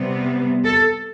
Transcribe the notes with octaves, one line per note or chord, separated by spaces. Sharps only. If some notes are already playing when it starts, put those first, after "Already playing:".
Already playing: C3 G3 B3
A4